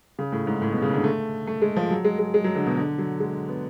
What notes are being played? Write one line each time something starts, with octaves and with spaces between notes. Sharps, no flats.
C#3
A2
G#2
A2
B2
C#3
D3
A3
A3
G#3
F3
F#3
G#3
G#3
G#3
F#3
D3
B2
D3
F#3
G#3
B3